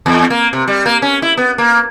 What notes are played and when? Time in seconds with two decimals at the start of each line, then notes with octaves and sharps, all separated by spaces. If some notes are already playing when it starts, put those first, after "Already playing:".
0.06 E2
0.30 A#3
0.53 C3
0.68 G3
0.86 A#3
1.02 C#4
1.22 E4
1.37 B3
1.58 A#3